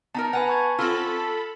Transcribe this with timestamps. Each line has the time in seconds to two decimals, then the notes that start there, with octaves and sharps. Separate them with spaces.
0.15 B3 D#4 A#4 A5 A#5
0.33 B4 F#5 G#5 B5
0.47 A5 C#6 G#6
0.79 C4 F4 A4 B5